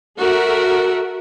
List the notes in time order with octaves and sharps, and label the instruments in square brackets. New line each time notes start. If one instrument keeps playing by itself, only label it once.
[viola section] F#4 A4 A#4 E5